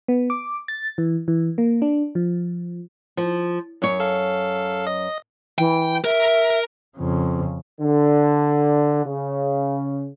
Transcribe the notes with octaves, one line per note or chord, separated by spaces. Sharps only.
B3
D6
A6
E3
E3
A#3
D4
F3
F3
F#2 C#5
A4 F5
D#5
E3 G5
A#4 E5
F2 C#3
D3
C#3